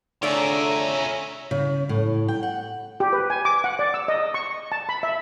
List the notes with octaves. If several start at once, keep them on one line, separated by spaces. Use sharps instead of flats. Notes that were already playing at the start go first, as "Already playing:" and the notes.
D3 A3 F4 G#4 C#5 D5 E5 A#5
C#3
A2
G5
F#5
G4
B4
G#5
D6
F#5
D5
E6
D#5
C#6
A5
B5
E5